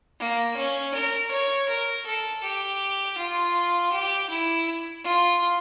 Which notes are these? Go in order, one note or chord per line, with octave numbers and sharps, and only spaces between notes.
A#3
C#4
A#4
C#5
A#4
A4
G4
F4
G4
E4
F4